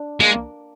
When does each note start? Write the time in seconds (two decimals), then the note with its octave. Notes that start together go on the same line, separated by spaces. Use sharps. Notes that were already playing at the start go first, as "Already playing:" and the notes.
Already playing: D4
0.20 G#3 A#3